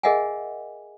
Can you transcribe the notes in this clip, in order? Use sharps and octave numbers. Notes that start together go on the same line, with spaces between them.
G#4 A#4 D#5 E5 F#5 G#5